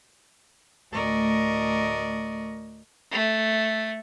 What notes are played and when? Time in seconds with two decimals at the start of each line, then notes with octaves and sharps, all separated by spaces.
0.91 D2 A2 A#4 D5 D#5 C#6
3.12 A3